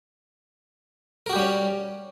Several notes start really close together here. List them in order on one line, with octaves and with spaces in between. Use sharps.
A#4 F#4 G4 G3 C#4